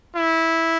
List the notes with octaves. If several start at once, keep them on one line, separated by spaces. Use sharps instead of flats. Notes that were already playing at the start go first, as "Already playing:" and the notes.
E4